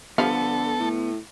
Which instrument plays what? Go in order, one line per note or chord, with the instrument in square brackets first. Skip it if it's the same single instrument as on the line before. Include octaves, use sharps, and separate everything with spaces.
[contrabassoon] D3 [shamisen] F3 G3 F5 [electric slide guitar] B3 [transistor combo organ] A4
[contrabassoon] A2